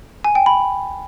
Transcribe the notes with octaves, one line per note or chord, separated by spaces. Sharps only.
G#5
G5
B5